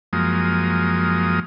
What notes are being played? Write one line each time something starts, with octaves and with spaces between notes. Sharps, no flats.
F#2 F3 G#3 A#3 D#6